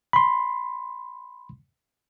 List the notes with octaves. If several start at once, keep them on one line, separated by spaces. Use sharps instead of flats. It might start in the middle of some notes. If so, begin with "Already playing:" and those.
B5 C6